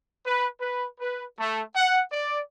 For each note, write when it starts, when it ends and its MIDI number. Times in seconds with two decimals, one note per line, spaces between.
0.25 0.47 71
0.59 0.86 71
0.99 1.23 71
1.38 1.60 57
1.74 2.00 78
2.11 2.40 74